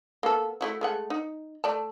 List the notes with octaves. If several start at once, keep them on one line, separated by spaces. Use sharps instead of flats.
A#3 B3 A4
A3 E4 F#4
G#3 A3 F#5
D#4
A3 D5 A5